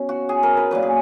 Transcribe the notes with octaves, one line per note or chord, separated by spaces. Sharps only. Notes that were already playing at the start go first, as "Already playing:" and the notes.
Already playing: B2 F#3 C#4
F#4
G#4
A#4
B4
A#2 F#3 B4
G#4